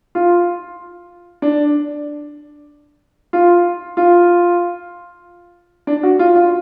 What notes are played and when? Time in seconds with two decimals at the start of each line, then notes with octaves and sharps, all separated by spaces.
0.15 F4
1.42 D4
3.33 F4
3.97 F4
5.87 D4
6.03 F#4
6.19 F4
6.35 F4